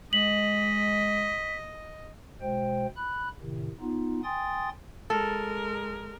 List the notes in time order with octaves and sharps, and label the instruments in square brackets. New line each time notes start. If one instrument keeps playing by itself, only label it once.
[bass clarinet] G#3 [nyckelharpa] D#5 [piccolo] B6 [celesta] F#7
[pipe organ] B2 G#3 C5 G5
B5 F#6
A2 C3 D#3
B3 D#4 F4
G5 G#5 C6 D#6 A6
[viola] G#3 A#4 [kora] A4